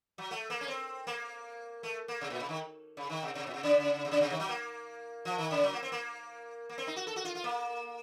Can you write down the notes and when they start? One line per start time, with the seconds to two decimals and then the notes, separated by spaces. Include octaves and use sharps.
0.18 F#3
0.31 A3
0.50 A#3
0.61 C#4
0.68 C4
1.07 A#3
1.83 A3
2.08 A#3
2.21 C3
2.30 A#2
2.40 C#3
2.49 D#3
2.97 C#3
3.10 D#3
3.23 C3
3.35 C3
3.46 A#2
3.54 C3
3.63 C#3
4.05 C3
4.11 C#3
4.21 C3
4.31 D#3
4.40 F#3
4.49 A#3
5.25 F3
5.38 D#3
5.51 C#3
5.63 F#3
5.73 A#3
5.83 C4
5.92 A#3
6.69 A#3
6.78 C4
6.87 D#4
6.96 F#4
7.07 A4
7.16 F#4
7.25 F4
7.35 F4
7.44 A#3